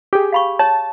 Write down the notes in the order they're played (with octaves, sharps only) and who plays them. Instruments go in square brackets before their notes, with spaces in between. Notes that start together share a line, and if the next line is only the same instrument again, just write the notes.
[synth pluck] G4 G#4
[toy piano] F5 B5 C#6
[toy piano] C#5 [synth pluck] A5